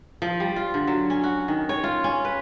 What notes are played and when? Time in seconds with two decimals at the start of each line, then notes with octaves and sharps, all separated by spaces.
0.22 F3
0.40 G3
0.56 F4
0.74 D3
0.87 F#3
1.10 C#4
1.24 F#4
1.48 D#3
1.69 C#5
1.84 F4
2.04 C#4
2.25 B4